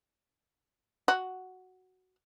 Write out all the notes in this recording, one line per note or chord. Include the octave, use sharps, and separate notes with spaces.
F#4